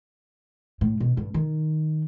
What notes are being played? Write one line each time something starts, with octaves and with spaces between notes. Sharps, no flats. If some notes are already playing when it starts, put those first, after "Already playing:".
A2
B2
G2
D#3